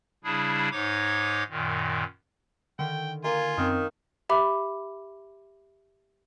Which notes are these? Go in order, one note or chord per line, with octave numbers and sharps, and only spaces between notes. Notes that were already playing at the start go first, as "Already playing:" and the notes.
C#3 G3 D4 E4 G#4
G#2 D#4 C#5 D6 G#6
F#2 A#2 D#3
D3 D#3 G5
A#3 F4 G#5
F#2 D#3 C4
G4 E5 B5 D6